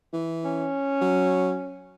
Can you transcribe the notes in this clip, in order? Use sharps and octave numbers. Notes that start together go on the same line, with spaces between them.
E3
C#4
F#3